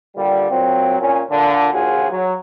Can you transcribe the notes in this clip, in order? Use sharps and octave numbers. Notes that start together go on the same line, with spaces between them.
A#2 D3 G3
A#2 F#3 C4
A#2 C#4
A#2 D3
A#1 D#2 F4 F#4 G#4
F#3